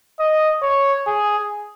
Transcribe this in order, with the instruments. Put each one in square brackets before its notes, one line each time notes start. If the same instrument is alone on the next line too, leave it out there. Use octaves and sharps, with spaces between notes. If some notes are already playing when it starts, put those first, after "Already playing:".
[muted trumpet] D#5
C#5
G#4